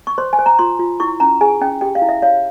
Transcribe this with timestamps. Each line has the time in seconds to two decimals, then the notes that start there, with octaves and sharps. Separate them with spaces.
0.07 C#6
0.18 C5 C6
0.33 G#5
0.39 C5
0.46 A#5
0.59 F4 C6
0.79 F4
1.00 E4 C#6
1.20 C#4 A#5
1.41 G#4 G#5
1.61 C#4 G5
1.81 G4 G5
1.95 F5
2.02 E4
2.09 E5
2.22 C#5 F5